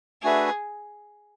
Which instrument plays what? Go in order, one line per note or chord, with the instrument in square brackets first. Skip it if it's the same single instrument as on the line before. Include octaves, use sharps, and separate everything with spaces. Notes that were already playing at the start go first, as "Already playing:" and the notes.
[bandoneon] A3 D4 F#4 B4 E5 [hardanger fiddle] G#4